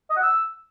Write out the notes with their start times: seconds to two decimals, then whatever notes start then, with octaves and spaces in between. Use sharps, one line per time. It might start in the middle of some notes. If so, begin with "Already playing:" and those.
0.10 D#5
0.16 F#5
0.23 E6